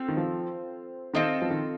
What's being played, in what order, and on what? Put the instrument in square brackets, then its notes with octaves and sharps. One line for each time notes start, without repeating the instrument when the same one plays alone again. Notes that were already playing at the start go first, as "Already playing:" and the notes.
Already playing: [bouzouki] C4 F4 A4
[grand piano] D#3
F3
[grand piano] D#3 [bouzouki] C4 F4 A4 D#5
[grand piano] F3
D#3